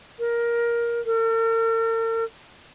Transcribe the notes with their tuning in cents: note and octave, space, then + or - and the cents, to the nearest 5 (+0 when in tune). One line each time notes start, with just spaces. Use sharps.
A#4 +15
A#4 -45